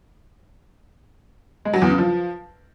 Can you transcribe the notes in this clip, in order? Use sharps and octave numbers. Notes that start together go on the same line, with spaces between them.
G#3
F#3
E2
C#3
F3